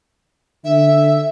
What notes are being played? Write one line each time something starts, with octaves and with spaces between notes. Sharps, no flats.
D3 E5